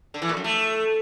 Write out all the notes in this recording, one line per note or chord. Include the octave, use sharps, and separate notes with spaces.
D3
E3
A#2
F#2
A3